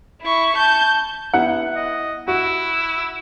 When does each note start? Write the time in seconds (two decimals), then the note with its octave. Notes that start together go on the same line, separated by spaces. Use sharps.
0.22 E4 C#6
0.56 A5 G6
1.34 B3 E4 F#5
1.75 D#5
2.28 E4 F#4